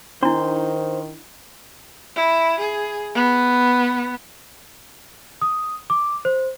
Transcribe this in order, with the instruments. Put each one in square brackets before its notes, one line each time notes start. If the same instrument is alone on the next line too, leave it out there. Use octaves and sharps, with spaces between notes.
[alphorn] D#3 [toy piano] D4 E4 [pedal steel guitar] C5 C6
[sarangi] E4
G#4
B3
[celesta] D#6
D6
C5